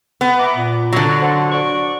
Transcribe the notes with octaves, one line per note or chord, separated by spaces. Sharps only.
B3
E5 A#5 D6
A#2
D3 F#3
A4 C5 F#5
D5 C#6